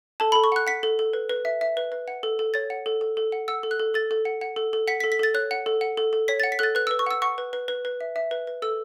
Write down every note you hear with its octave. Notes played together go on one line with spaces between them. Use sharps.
A4 A5
B5
A4
C#6
F#5 F#6
F#5 B6
A4
A4
B4
B4
E5
E5
B4
B4
F#5
A4
A4
C#5 A6
F#5
A4
A4
A4
F#5
F#5 E6
A4
F#6
A4
A4 A6
A4
F#5
F#5
A4
A4
F#5 B6
B6
A4
B6
A4 A6
C#5 F#6
F#5
A4
F#5
A4
A4
C#5 B6
A6
F#5
B6
A4 F#6 A6
B4 F#6
E6
B4
C#6
F#5 E6
F#5 C#6
B4
B4
B4
B4
E5
E5
B4
B4
A4 E6